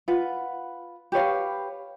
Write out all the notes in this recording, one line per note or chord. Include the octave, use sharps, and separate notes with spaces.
F4 B4 F#5
G4 B4 C#5 F5